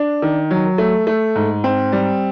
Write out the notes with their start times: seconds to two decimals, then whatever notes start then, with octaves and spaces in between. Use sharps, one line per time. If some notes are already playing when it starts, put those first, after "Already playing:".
Already playing: D4
0.22 D#3
0.51 F#3
0.78 A3
1.07 A3
1.36 G#2
1.64 C4
1.92 G3